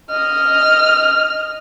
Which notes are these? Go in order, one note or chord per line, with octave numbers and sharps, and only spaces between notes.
D#5 F6